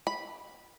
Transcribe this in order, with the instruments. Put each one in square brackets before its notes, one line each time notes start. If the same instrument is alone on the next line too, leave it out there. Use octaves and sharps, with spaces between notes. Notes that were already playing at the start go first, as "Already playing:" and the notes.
[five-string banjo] B5